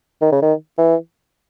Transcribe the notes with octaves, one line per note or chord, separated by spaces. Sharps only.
D#3
C#3
D#3
E3